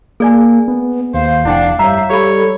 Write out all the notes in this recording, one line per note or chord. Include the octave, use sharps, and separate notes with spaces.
A#3 G#4 D5 G#5
B3
D#2 C5 F5
F1 D4 E4 F#5 G5
G2 C#5 E5 A#5
G3 G4 A4 C#5 B5